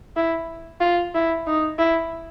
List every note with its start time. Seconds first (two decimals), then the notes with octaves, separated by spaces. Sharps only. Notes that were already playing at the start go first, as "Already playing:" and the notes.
0.16 E4
0.81 F4
1.14 E4
1.46 D#4
1.79 E4